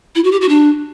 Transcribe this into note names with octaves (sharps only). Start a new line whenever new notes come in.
E4
F#4
G4
F#4
D4